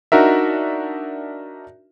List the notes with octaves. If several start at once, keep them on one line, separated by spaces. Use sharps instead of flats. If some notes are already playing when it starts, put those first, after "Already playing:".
D4 D#4 F#4 A#4 E5